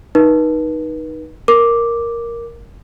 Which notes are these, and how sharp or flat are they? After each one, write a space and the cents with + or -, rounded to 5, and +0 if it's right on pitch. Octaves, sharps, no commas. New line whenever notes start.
D#4 +0 B4 -35
A#4 +0 D6 +0